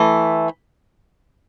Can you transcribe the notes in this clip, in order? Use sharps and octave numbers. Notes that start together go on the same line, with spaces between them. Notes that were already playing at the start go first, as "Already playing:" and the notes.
Already playing: E3 A3